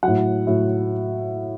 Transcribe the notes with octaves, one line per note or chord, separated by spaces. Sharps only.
A2 F#3 F#5
A2 F#3